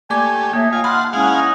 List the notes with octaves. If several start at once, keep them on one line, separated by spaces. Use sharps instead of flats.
A3 A#3 G4 D5 G#5 D6
A#3 D#4 C#5 E5 A5
F4 F5 G5 G#5
F#5 A5 B5 C6 F6
G#3 C#4 E4 G#4 F5 F#5 G#5
D#4